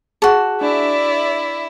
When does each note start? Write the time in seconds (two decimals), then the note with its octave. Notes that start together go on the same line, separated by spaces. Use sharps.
0.22 F#4 G#4 A5 C#6
0.61 D4 E4 D5 E5